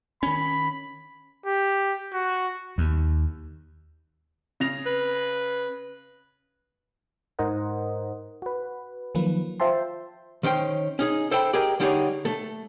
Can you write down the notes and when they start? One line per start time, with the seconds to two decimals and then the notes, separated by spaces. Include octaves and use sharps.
0.23 D#3 C#4 B5
1.46 G4
2.13 F#4
2.78 D#2
4.60 C#3 A#6 F7
4.86 B4
7.39 G#2 D#4 A#4 C5 D#5 F#5
8.42 F#4 B4
9.15 D#3 F3 F#3 A#3 B4
9.60 F4 C5 E5 G5 A5 C6
10.43 D#3 C#4 C5 G5
10.99 C#4 D#4 G#4
11.31 A4 C5 E5 G5 A5 B5
11.53 G4 G#4 A#4 D#5
11.80 D3 G3 D4 D#4 G#4 C#5
12.25 A3 A4